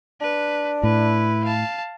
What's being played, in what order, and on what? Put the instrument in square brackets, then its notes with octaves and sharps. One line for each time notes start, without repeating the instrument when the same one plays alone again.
[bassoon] D4 [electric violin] B4
[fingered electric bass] A2 [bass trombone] E4 [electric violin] B4
[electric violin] F5 A5